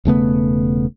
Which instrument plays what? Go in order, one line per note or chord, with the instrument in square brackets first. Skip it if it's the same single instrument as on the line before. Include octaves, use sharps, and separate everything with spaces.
[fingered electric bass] E1 C#3 A3 B3